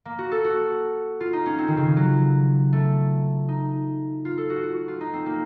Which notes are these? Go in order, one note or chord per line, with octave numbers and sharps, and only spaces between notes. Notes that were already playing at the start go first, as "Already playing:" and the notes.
A#3
F#4
A4
F#4
F4
D#4
C#4
C4
D#3
C#3
F#3
A3
D#4
F4
A4
F#4
F#4
F4
D#4
C4
A#3